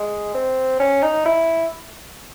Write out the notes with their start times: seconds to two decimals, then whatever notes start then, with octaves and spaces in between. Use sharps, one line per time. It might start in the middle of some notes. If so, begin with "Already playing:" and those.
Already playing: G#3
0.34 C4
0.80 C#4
1.02 D#4
1.25 E4